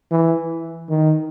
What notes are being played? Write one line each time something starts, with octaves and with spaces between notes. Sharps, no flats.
E3
D#3